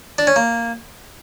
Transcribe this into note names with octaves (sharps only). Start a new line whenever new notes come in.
D4
C#4
A#3